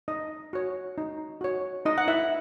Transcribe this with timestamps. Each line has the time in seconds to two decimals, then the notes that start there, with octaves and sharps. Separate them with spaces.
0.08 D#4 D#5
0.53 F#4 C#5
0.98 D#4
1.41 F#4 C#5
1.85 D#4 D#5
1.98 F#5
2.08 E4 E5